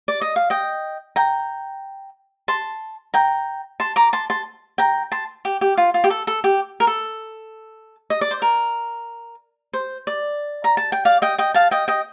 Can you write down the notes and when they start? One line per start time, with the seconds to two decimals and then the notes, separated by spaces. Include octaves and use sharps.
0.08 D5
0.22 D#5
0.36 F5
0.50 D#5 G5
1.16 G5 A#5
2.48 A5 C6
3.14 G5 A#5
3.80 A5 C6
3.96 A#5 D6
4.13 A5 C6
4.30 A5 C6
4.78 G5 A#5
5.12 A5 C6
5.45 G4
5.61 G4
5.78 F4
5.94 F4
6.04 G4
6.10 A4
6.27 A4
6.44 G4
6.80 A#4
6.87 A4
8.10 D#5
8.21 D5
8.31 C5
8.42 A#4
9.73 C5
10.07 D5
10.64 A#5
10.77 A5
10.92 G5
11.05 D5 F5
11.22 D#5 G5
11.38 D#5 G5
11.54 F5 A5
11.71 D#5 G5
11.88 D#5 G5